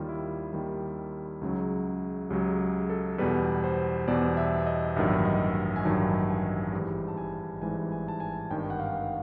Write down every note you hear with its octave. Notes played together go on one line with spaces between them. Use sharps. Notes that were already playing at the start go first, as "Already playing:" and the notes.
Already playing: D#2 D#3 G3 F4
E4
D#2 D#3 G3
C#2 C#3 F#3
C#2 C#3 F#3 G4
G#4
A4
E2 B2 G3 B4
C5
E2 B2 G3 D5
E5
D#5
A1 G2 D#3 F#3 E5
D#5
G#5
A1 G2 D#3 F#3 A5
G#5
G#1 G#2 E3 G3
A5
G#5
G#1 G#2 E3 G3 G#5
G#5
A5
G#5
G#1 G2 D#3 G5
F#5
F5